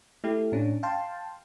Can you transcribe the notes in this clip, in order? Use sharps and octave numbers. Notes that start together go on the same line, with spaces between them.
A3 E4 G4
A2 C#4 D4
F5 G5 A5 C6